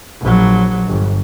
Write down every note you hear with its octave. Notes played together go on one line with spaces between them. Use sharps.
A#1 F#3
G1